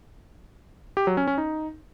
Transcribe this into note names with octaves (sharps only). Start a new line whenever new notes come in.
G4
F#3
C#4
C#4
D#4